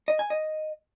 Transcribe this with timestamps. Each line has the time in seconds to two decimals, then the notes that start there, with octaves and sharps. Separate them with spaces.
0.08 D#5
0.19 G#5
0.30 D#5